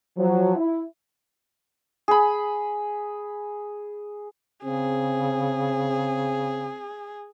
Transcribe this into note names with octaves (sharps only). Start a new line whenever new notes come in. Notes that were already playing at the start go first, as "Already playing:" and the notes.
F3 F#3
E4
G#4 B5
C#3 C4 G#4